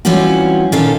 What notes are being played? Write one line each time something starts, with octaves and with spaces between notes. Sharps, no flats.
E3 G3 C4 C#4 F4 F#4
A#2 D#3 C#4 F4 A4 F5